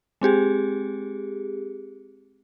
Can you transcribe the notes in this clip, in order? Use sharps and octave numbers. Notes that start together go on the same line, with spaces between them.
G#3 C4 G4 G#4